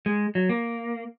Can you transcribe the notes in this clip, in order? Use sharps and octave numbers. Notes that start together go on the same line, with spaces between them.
G#3
F#3
A#3